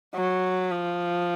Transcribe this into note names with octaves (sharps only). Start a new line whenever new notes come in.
F#3
F3